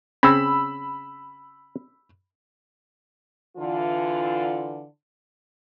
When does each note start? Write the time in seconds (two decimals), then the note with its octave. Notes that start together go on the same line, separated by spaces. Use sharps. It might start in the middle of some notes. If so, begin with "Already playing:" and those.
0.23 C#3 C4 C#4 B5 E6
3.57 D3 E3 F4